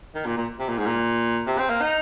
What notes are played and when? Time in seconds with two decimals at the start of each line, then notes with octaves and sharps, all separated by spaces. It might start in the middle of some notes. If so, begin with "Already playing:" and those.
0.15 D#3
0.26 A#2
0.37 A#2
0.59 C3
0.68 A#2
0.77 G#2
0.86 A#2
1.47 C3
1.58 C4
1.69 A#3
1.81 D#4